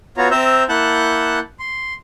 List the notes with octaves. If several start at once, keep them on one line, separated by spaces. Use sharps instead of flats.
B3 F4 F#4 C#5 A#5
C4 C5 E5 A#5 E6 G6
A#3 E4 F#5 A5 F#6 G6
C6